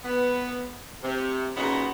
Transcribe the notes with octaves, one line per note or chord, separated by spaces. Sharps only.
B3
C3
A#2 C#3 B3 C#4 D#4 F#4